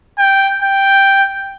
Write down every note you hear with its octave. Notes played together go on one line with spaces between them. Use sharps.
G5
G5